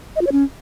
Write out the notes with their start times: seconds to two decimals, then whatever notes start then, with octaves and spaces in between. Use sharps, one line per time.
0.16 D#5
0.21 F4
0.27 C#5
0.32 C#4